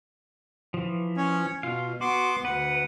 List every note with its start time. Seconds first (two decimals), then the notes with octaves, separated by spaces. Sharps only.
0.74 E3 F3
1.17 C#4 C#5
1.63 B2 F4 F5
2.01 B3 F#4 C6 D6
2.45 D2 B4 F#5